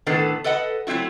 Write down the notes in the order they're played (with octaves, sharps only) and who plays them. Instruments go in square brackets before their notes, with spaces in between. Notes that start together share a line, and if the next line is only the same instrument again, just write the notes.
[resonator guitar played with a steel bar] A2 D#3 B3 D4 A4
A4 B4 D#5 F#5
F#3 A3 C4 E4 F#4